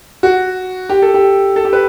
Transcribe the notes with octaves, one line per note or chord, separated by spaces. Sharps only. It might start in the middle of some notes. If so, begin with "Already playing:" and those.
F#4
G4
A4
G4
A4
G4
B4